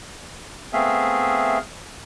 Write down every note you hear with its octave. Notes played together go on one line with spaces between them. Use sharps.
A3 B3 C4 G#4 E5 F5